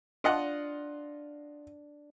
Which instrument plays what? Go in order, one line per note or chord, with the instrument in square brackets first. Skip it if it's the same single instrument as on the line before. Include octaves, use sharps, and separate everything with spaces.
[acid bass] D4 [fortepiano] F4 D#5 F#5